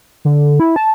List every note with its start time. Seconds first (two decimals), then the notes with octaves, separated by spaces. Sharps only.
0.25 D3
0.60 E4
0.76 A5